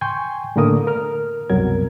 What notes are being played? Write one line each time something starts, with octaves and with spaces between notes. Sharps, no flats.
G5 G#5 C6 C#6 G6
A2 D3 A3 A#3 A#4 D#6
A#4 F6
C2 F#2 B2 F#3 A#4 G#6